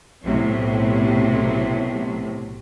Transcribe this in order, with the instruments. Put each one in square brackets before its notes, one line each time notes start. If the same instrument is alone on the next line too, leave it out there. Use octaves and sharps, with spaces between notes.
[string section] B1 A2 C3 F#3